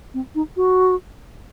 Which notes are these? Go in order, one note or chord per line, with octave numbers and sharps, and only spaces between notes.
C4
D#4
F#4